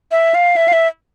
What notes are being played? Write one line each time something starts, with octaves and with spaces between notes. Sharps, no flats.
E5
F5
E5
F5
E5